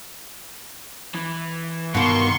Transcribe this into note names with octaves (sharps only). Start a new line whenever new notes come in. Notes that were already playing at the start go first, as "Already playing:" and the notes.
E3
G2 B2 D#3 G3 A#3 C6 C#6